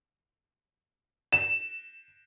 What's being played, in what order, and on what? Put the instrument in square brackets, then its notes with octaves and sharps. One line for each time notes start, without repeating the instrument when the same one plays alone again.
[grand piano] E7